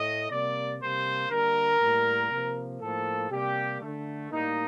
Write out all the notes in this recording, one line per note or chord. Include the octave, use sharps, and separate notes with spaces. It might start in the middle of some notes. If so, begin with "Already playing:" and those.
Already playing: A2 A3 D#5
C3 G3 A#3 D5
C3 G3 A#3 C5
D3 G3 A#3 A#4
A2 G3 A#3
C3 F3 A#3
A2 F3 A#3 A4
C3 G3 A#3 G4
D3 A3
A2 G3 A#3 D#4